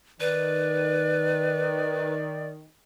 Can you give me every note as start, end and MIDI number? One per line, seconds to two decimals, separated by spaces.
0.20 2.68 51
0.20 2.13 71
0.20 2.49 74